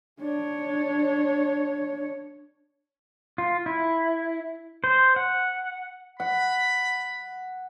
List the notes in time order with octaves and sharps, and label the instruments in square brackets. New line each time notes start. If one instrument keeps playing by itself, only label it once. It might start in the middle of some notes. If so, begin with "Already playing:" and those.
[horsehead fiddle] D4 C#5
[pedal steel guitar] F4
E4
C5
F#5
[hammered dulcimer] F#5 [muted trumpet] B5